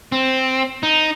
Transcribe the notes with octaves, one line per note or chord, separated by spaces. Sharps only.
C4
D#4